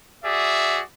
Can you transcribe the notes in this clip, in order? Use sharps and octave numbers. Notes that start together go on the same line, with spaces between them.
F#4 G#4 D5 E5